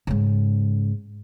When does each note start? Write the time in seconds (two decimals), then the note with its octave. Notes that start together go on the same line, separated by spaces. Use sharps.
0.07 G#2 C#3